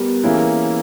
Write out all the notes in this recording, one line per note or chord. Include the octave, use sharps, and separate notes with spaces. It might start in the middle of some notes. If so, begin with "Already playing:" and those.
Already playing: G3 B3 A#4
E3 A#3 C#4 E4 G#4